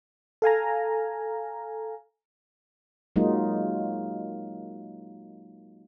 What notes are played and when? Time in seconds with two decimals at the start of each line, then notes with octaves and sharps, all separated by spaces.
0.42 A4 F5 G#5 A#5
3.16 F#3 G#3 A#3 D#4 F4